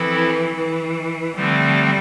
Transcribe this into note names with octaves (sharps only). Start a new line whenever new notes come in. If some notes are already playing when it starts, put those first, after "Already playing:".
Already playing: E3 F3 C4 E4 A4
E3
D3 F3 G3 A3 C4